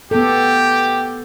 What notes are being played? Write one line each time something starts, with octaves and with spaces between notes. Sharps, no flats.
B3 G4 A4